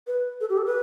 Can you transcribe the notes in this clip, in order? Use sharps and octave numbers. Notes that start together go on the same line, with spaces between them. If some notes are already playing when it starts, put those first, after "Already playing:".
B4
A4
G4
A4
B4